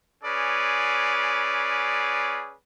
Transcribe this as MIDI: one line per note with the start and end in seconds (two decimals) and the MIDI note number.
0.24 2.55 61
0.24 2.55 68
0.24 2.55 71
0.24 2.55 74